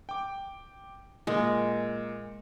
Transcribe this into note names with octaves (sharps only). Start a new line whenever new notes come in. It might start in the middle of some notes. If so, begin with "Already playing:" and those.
G5 D6
A#2 G#3 A#4